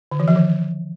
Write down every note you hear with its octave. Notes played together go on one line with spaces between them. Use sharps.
D3
E3
F3
D#3